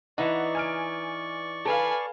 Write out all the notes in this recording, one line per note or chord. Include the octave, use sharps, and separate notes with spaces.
E3 D#4 D5 F#5 C#6
G#5 F6 D7
A4 B4 F5 G#5